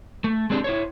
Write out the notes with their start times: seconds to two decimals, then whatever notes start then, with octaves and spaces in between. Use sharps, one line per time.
0.24 A3
0.50 G#3 C4 D4 G4
0.64 E4 C5 C#5